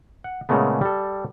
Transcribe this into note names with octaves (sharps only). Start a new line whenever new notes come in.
F#5
A#2 C#3 G#3 A3 B3
G3 A4